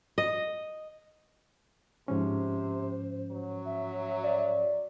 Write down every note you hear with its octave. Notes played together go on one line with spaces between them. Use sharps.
D#5
G#2 C3 F3 C#4 C5
F#3
E5
D5